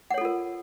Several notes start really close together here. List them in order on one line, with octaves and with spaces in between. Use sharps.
F#5 C#5 A4 F4 A#4